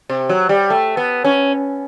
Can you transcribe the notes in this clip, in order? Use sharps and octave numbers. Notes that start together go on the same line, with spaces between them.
C3
F#3
G3
A3
B3
C#4